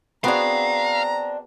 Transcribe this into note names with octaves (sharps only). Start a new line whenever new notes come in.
B3 C4 D4 F#4 G#4 F5 A#5